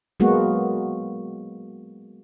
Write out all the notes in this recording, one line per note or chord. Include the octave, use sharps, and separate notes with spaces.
F#3 G#3 A#3 B3 F#4